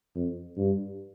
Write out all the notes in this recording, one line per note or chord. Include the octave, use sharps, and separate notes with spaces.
F2
G2